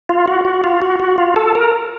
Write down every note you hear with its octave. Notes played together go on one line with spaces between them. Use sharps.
F4
F#4
F#4
F4
F#4
F#4
F4
A4
A#4